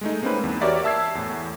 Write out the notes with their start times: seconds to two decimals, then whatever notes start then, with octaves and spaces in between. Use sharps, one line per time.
0.01 G#3 A3 D#4
0.22 G#3 A#3 C4 C#4 D#4 B4
0.44 E2
0.61 F#4 G4 A#4 C#5 D5 E5
0.84 E5 A5 E6 G#6 C7
1.15 E2 A2